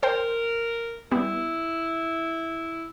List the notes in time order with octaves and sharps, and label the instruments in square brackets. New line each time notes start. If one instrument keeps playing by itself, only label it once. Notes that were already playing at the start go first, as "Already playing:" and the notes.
[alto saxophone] A#4 [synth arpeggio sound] C5 G5
[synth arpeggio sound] G3 B3 [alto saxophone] E4